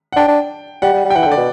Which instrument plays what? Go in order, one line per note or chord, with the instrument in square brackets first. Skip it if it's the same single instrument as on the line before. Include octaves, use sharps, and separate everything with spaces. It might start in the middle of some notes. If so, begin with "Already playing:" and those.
[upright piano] F#5
[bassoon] D4 [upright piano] G5
[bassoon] D4
[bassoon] G3 [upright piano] F#5
[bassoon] G3
G3
[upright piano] G5
[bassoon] E3 [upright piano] F#5
[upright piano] G5
[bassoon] D3 [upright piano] D5
[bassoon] B2